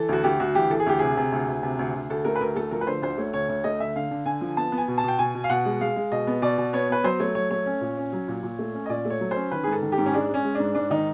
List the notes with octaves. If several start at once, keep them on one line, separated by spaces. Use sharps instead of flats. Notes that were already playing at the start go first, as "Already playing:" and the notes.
Already playing: E3 A4
D2 F#4
D2 G4
D2 F#4
E3 G4
E3 A4
G#4
D2 G4
C3 G#4
C3
D2
D2
C3
D2
D2
D2 A4
A3 A#4
B4
D2 A#4
A3 A4
F3 A#4
B4
D3 C5
D2 C5
A3 C#5
D2 C#5
D2 C#5
A3 D#5
D3 E5
D3 F5
D3
D3 G#5
F3
B3 A5
B3
G#5
B2
A5
B2 G5
B2 G#5
B2
F5
B2 F#5
G#3
G#3 F5
G#3
B2 D#5
B3
B2 D5
B2
B3 C#5
B3 B4
F#3 C5
A3 C#5
F#3 C#5
A3 C#5
C#4
A#2
C#4
F#3
A#2
A#2
A3
C#4
D#5
A#2 D5
A3 C#5
F#3
C#4 C5
D#3 B4
G#2 G#4
A4
D#3
G4
G#2
C#4
G#3 D4
G#3
C#4
G#3
G#2 D4
G#2 D4
D#3 D#4